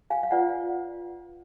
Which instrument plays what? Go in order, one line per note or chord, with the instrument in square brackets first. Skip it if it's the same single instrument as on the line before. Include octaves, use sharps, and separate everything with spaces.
[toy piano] F5 G#5
F5
F4 B4 D5 F#5